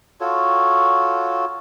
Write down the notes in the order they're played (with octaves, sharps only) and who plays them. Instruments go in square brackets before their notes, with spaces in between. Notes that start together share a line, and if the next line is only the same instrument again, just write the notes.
[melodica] F4 F#4 A4 C#5